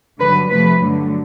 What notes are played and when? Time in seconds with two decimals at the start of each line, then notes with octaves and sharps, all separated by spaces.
0.20 G2 D3 F#3 B4
0.51 C3 F3 A3 B4
0.80 G2 D3 F#3 A3